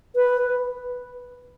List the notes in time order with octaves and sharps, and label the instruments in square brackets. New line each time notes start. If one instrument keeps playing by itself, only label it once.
[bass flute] B4